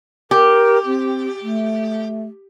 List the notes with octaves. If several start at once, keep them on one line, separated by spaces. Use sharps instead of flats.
G4 A#4
C4
A3